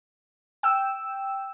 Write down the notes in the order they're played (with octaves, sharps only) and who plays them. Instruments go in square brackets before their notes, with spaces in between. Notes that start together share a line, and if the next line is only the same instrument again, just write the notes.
[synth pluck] G5 E6